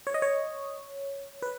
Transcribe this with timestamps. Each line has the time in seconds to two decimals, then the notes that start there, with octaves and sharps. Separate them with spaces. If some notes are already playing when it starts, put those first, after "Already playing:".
0.07 C#5
0.14 D#5
0.22 C#5
1.42 B4